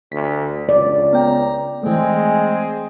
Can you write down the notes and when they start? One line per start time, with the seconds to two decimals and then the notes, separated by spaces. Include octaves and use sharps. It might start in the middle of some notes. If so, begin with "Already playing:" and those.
0.12 D2 B6
0.69 C#2 D5
1.13 B3 G5 A#5
1.83 E3 G#3 A3 C4 G#4